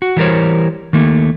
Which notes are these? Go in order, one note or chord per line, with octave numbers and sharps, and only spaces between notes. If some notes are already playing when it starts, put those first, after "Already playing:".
F#4
E3 F#3 G3 A#4 C5 C#5
D#3 A3 A#3